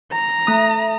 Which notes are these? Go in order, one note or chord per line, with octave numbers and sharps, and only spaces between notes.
A#5
A3 D#6